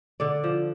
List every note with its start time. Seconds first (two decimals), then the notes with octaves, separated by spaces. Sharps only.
0.20 D3 D5
0.44 F3